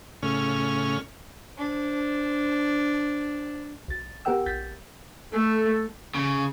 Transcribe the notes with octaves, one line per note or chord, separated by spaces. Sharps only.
A2 C#3 C#4 F6
D4 C5
B1 A6
B3 G4 A#4 F#5 G5 E6
A#1 G6 A6 B6
A3 A4
C#3